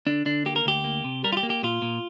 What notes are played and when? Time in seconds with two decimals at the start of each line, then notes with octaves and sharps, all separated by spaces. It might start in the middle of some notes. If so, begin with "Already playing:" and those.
0.07 D3 D4
0.25 D3 D4
0.46 A#3 G4
0.56 A#4
0.66 D2 G4
0.84 A#3
1.04 C3
1.24 G3 A#4
1.33 F4
1.37 G4
1.43 A#3
1.50 G4
1.63 A#2 F4
1.82 A#2